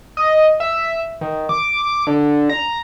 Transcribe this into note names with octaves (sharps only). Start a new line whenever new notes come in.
D#5
E5
D#3
D6
D6
D3
A#5